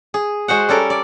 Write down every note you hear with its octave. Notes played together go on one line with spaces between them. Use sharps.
G#4
G#3 F#4 C5 F#5
G3 C#4 A4 A#4
D5